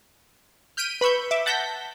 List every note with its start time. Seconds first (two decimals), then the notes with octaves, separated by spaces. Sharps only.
0.77 F6 G6 B6 D7 D#7
1.01 B4 B5 C#6 E6 G6
1.31 E5 D6
1.46 F#5 A5 G6 A#6 B6